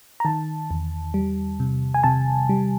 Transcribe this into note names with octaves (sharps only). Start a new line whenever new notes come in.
A#5
D#3 A5
E2
G3
C3
G#5
C3 A5
G3